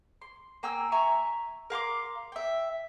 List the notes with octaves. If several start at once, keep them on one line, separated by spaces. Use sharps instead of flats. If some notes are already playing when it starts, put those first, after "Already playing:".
C6
A#3 G5 G#5 E6
E5 G#5 A#5 C#6
A#4 F5 C6 D6
E5 G5